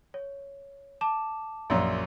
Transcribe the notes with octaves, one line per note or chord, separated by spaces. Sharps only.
C#5
A5 D6 E7
A#1 F#2 E5 C6 E6